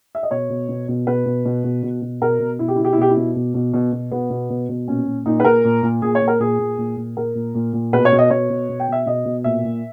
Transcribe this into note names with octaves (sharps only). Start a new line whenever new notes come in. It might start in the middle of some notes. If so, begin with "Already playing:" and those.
E5
D#5
B2 C#5
B2
B2
B2
B2 B4
B2
B2
B2
B2
B2
B2 A#4
B2
B2 E4
G4
B2 E4
G4
E4
B2 G4
E4
B2
B2
B2
B2
B2
B2 B3
B2
B2
B2
A#2 C#4
A#2
A#2 D#4
B4
A#2 A#4
A#2
A#2
A#2 G#4
C#5
A#2
A#4
A#2 G#4
A#2
A#2
A#2
A#2 A#4
A#2
A#2
A#2
B2 B4
C#5
B2
D#5
B2 C#5
B2
B2
G5
B2 E5
B2 D#5
B2
A#2 E5
A#2